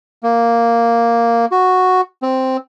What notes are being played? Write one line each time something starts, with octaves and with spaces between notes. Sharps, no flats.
A#3
F#4
C4